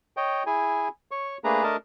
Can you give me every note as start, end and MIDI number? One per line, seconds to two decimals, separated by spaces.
0.17 0.43 73
0.17 0.43 75
0.17 0.43 79
0.46 0.88 64
0.46 0.88 68
0.46 0.88 80
1.11 1.38 73
1.11 1.38 85
1.44 1.63 57
1.44 1.63 58
1.44 1.63 62
1.44 1.63 68
1.44 1.63 71
1.44 1.63 82
1.63 1.76 57
1.63 1.76 62
1.63 1.76 70
1.63 1.76 75
1.63 1.76 81